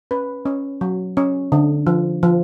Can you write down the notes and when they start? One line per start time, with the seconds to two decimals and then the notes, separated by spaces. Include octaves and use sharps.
0.11 C#4 B4
0.46 C#4
0.81 F#3
1.17 C#4
1.52 D3
1.87 F3
2.23 F3